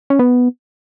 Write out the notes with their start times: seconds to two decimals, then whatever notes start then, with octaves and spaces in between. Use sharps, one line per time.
0.10 C#4
0.19 B3